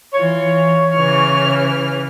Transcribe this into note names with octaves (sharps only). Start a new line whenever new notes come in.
E3 F4 C#5
C#3 E3 F6